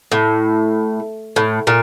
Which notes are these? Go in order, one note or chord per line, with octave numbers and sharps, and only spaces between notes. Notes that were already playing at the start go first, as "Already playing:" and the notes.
A2
A2
A#2